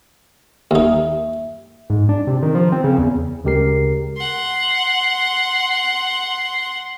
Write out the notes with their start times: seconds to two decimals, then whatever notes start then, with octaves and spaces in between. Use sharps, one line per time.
0.71 D#2 D#4 E5
1.90 G#2
2.09 D4
2.27 C3
2.43 D#3
2.55 F3
2.72 C4
2.84 C#3
2.98 E2
3.44 D2 C#3 G#3 G4 A#4 C7
4.16 F#5 C6